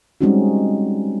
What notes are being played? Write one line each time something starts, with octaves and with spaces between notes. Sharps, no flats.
G3 G#3 C4 C#4 D#4 F#4